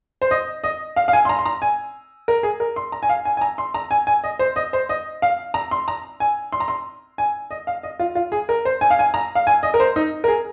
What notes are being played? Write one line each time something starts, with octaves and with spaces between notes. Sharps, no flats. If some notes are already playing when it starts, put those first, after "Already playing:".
C5
D#5
D#5
F5
F5
G#5
C6
A#5
C6
A#5
G#5
A#4
G#4
A#4
C6
A#5
G#5
F5
G#5
G#5
A#5
C6
A#5
G#5
G#5
D#5
C5
D#5
C5
D#5
F5
A#5
C6
A#5
G#5
C6
A#5
C6
G#5
D#5
F5
D#5
F4
F4
G#4
A#4
C5
G#5
F5
G#5
A#5
F5
G#5
D#5
A#4
C5
D#4
A#4
G#4